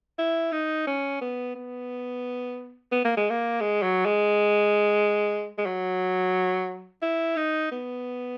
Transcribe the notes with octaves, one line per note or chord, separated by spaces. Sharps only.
E4
D#4
C#4
B3
B3
B3
A#3
G#3
A#3
G#3
F#3
G#3
G#3
F#3
E4
D#4
B3